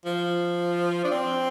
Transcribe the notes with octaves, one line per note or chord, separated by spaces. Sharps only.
F3
D4
C4